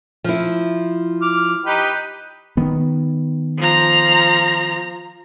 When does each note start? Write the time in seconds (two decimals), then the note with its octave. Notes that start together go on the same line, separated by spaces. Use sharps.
0.24 F3 E4
1.22 D6 F6
1.66 D#4 G4 B4
2.57 D#3 B3
3.57 F3 A#5